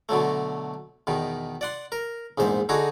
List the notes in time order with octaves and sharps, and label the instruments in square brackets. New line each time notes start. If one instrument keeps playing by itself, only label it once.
[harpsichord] B2 D3 F#3 A3
E2 B2 D#3
D5 F#5 C6
A#4
A#1 E2 G#2 C5
D3 D#4 F#4 G#4